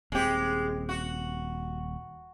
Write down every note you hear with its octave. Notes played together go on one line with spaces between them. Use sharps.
D#1 G#3 C4 G4
F#4